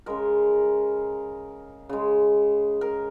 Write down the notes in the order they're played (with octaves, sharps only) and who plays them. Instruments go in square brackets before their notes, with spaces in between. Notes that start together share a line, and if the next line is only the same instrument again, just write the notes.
[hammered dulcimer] C#3 G#3 A#4
C#3 G#3
A#4